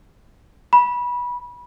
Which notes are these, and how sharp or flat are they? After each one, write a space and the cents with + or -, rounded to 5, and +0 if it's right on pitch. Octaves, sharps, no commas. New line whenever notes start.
B5 -20